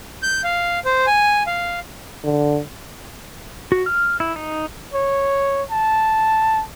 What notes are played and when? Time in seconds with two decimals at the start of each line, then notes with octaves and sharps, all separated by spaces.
0.23 G6
0.44 F5
0.85 C5
1.07 G#5
1.47 F5
2.24 D3
3.72 F#4
3.86 F6
4.20 E4
4.36 D#4
4.93 C#5
5.71 A5